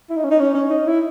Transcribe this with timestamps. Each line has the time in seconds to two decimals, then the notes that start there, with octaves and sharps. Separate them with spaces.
0.10 E4
0.17 D#4
0.24 C#4
0.31 D#4
0.40 C#4
0.54 C#4
0.70 D#4
0.87 E4